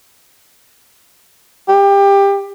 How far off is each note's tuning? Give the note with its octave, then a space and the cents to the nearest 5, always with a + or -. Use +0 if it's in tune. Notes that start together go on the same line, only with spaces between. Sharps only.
G4 +20